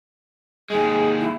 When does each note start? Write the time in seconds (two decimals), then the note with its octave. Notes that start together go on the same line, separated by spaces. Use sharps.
0.70 D#2 G#3 G#4
1.21 E4